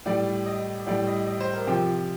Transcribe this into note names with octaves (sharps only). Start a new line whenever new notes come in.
A2 G3 D5
D#5
A2 G3 D5
D#5
D#5
C5
A#4
C3 F3 G4